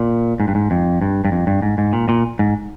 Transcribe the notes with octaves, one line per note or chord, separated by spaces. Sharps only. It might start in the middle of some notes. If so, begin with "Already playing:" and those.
Already playing: A#2
G#2
G2
G#2
F2
G2
G2
F2
G2
G#2
G#2
A#2
A#2
G#2